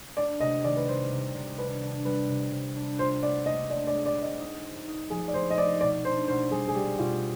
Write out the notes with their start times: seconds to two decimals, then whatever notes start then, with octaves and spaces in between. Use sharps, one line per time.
0.17 D4 D5
0.40 C3 D#5
0.64 D#3 D5
0.77 B4
0.88 G3 C5
1.12 C3
1.35 C3
1.58 D4 B4
1.82 D4
2.05 G3 B4
2.29 C3
2.52 C3
2.76 D4
2.99 F4 C5
3.22 B3 D5
3.46 D4 D#5
3.70 D4 D5
3.87 D5
3.94 G#3
4.06 D5
4.17 B3
4.23 D#5
4.40 D#4
4.64 C4
4.87 D#4
5.10 F3 G#4
5.28 D5
5.34 D#4 C5
5.50 D#5
5.58 D#4 D5
5.81 B2 D5
6.05 D4 C5
6.28 B2 C5
6.51 G3 G#4
6.68 G#4
6.75 G3 G4
6.99 B2 F4